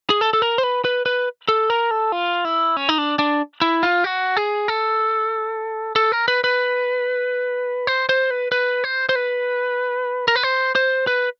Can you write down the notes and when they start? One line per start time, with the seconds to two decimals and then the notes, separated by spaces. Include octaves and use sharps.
0.10 G#4
0.21 A4
0.33 A4
0.42 A#4
0.58 C5
0.63 B4
0.85 B4
1.06 B4
1.49 A4
1.70 A#4
1.91 A4
2.12 F4
2.45 E4
2.77 C#4
2.89 D#4
2.98 D4
3.19 D4
3.61 E4
3.83 F4
4.04 F#4
4.37 G#4
4.68 A4
5.96 A4
6.12 A#4
6.28 B4
6.44 B4
7.87 C5
8.09 C5
8.30 B4
8.52 B4
8.84 C5
9.09 C5
9.15 B4
10.28 A#4
10.36 B4
10.43 C5
10.75 C5
11.07 B4